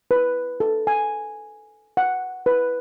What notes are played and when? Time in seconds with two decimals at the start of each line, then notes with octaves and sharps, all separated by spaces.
0.11 B4
0.60 A4
0.87 G#5
1.97 F#5
2.46 B4